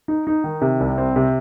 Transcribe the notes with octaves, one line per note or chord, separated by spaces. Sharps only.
D#4
D#4
D#3
C3
C2
C4
C3